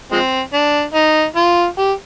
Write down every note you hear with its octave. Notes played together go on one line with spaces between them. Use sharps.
F3 G#3 C4
D4
D#4
F4
G4